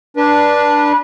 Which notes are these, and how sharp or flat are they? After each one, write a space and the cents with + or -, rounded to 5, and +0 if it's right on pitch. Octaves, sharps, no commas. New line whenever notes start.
D4 +0 B4 -30